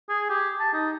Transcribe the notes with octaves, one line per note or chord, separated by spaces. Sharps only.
G#4
G4
A5
D#4